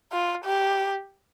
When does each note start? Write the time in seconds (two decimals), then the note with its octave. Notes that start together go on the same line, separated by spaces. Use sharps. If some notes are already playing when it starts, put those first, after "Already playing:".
0.12 F4
0.45 G4